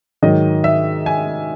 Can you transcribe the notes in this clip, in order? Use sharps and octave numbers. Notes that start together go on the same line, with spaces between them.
G#2 D#3 F#3 D#5
E5
G#5